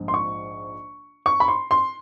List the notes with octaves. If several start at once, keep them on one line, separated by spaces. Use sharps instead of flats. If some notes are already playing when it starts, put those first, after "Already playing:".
Already playing: A#1 G#2 F3
C6
C#6
C#6
B5
C6
C6